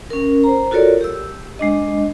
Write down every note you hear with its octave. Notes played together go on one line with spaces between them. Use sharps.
C#4 A#4
C5 A#5
F4 F#4 A4 A#4 C#5 D5
G4 E6
G#3 D4 D#5